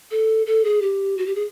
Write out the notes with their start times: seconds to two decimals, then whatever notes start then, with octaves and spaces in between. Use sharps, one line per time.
0.11 A4
0.46 A4
0.65 G#4
0.82 G4
1.17 F#4
1.26 G4
1.35 G#4